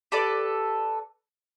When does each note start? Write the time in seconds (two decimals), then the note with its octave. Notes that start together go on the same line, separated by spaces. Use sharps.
0.12 G4 A4 B4 D5